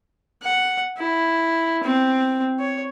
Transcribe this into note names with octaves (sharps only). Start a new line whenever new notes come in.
F#5
E4
C4
C#5